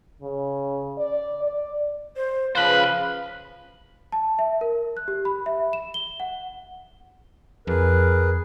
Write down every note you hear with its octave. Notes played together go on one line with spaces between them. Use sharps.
C#3
D5
D5
C5
C#3 F3 B4 C5 F5 B5 F#6
A5
E5
A#4
F#6
G4
B5
E5
E7
G7
F#5
F2 G#4 A#4 B4